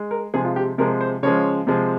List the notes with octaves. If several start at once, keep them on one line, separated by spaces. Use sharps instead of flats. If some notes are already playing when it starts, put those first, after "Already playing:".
Already playing: G#3
A#4
C3 F3 G#3 G#4
F4
G4
C3 F3 G#3 A#4
C5
C#3 F3 G#3 C#5
C3 F3 G#3